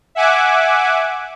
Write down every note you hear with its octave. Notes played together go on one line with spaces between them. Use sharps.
E5 F#5 G#5 D6